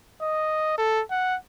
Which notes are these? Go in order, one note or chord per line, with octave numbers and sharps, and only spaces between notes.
D#5
A4
F#5